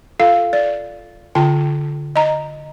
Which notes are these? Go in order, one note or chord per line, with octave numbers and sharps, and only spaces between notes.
F4 A4 F5
D5
D3 F4 G5 A5
D#5 A#5